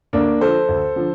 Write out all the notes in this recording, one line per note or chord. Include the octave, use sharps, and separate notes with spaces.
D2 A#3 D4
D3 F3 A4 C5
D2
D3 F3